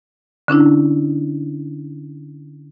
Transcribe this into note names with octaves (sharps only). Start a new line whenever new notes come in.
D3 C#4 D4 E4